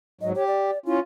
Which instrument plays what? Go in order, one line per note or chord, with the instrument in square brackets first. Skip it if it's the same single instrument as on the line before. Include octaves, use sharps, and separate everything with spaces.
[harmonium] G#2 F#3 [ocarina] D#5
[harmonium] G4 [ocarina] C#5
[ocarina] D5
[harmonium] C#4 F4 [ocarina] E4